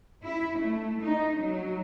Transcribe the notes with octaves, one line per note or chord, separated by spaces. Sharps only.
E4
A3
D#4
F#3